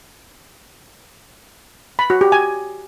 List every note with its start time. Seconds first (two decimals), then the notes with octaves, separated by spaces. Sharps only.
1.99 B5
2.10 F#4
2.21 G4
2.32 G#5